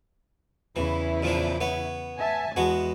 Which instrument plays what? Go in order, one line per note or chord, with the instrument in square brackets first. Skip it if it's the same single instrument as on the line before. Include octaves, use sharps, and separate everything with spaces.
[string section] E2 C#3 E4 [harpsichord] E3
[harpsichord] A#2 F3 D4
B3 C#5
[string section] E5 G#5 A5
[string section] E2 [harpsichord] G#3 B3 F#4